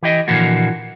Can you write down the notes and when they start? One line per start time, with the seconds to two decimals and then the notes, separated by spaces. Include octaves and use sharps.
0.03 E3 G4 D#5
0.28 A#2 D3 E3 F3 A#3 F#4